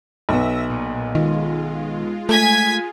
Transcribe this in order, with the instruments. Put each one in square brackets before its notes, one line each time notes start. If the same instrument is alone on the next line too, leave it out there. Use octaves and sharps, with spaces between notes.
[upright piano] B1 B3 [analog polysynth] E5 E6 A#6
[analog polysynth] A#2
[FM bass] D#3 [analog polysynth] G#3 F4
[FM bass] A3 [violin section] G#5 G#6 B6